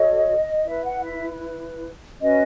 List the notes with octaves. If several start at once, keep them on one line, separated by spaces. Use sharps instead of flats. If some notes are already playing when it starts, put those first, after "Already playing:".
Already playing: F#4 A4 C#5 D#5
E4 B4 E5
F#5
E5
C#4 F#4 B4 D#5